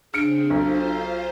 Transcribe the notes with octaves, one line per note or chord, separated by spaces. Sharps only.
C#3 C4 D4 G#4 F6 C#7 D7
B1 F4 A4 C5